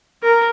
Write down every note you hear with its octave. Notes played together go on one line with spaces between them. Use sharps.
A#4